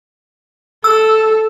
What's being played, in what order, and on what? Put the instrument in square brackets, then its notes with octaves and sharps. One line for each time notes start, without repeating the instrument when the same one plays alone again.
[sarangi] A4 [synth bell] E6